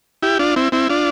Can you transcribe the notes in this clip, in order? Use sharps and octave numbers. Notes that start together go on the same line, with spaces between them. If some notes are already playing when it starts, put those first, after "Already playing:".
E4 G4
D4 F4
C4 E4
C4 E4
D4 F4